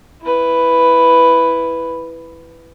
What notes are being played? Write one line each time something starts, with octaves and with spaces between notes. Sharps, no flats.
E4 B4